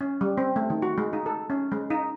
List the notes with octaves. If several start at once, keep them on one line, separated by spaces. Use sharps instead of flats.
C#4
G3
C4
A3
D#3
F#4
G#3
D#4
A4
C#4
G#3
D#4